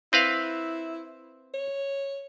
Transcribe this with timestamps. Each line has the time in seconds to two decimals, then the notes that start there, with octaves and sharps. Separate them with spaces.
0.13 C4 E4 B4 F5
1.54 C#5